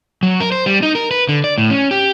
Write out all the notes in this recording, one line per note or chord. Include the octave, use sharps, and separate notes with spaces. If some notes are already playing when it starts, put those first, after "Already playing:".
F#3
A#4
C5
G3
D#4
A#4
B4
D3
D5
A2
C#4
G4